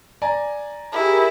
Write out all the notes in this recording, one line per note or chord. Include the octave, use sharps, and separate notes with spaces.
D5 G#5 A#5
E4 G4 G#4 A#4